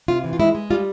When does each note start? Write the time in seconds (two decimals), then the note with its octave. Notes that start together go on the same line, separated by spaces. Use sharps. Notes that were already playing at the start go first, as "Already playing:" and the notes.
0.08 C3 F4
0.24 E3
0.33 F4
0.39 G#3 E4
0.55 G#3
0.70 G3 F4